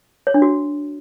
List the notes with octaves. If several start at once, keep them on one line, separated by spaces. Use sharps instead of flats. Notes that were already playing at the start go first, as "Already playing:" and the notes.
C#5
D4
F#4